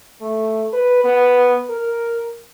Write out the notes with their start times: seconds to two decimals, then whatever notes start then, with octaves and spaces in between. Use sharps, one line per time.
0.21 A3
0.73 B4
1.04 B3
1.70 A#4